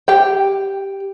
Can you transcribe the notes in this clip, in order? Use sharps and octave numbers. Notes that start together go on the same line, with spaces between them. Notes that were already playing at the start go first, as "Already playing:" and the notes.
G4 G5